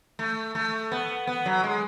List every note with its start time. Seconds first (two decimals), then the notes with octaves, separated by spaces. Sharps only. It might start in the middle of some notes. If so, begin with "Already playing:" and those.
0.19 A3
0.55 A3
0.92 B3
1.27 B3
1.46 F#3
1.63 G#3